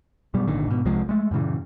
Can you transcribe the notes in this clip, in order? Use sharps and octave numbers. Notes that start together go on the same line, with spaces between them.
F#2 B2 G3
G#1 A#2 D3 D#3
G#2 B2
C2 C3 F3 G#3
G#3 A3
F#2 A#2 C#3 E3